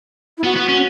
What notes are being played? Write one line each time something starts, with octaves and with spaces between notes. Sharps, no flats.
E4
B3 F#4
B3
C#4